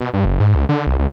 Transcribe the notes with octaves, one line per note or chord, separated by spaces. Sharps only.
B2
G2
F#1
G#2
C#2
D3
C2
C#2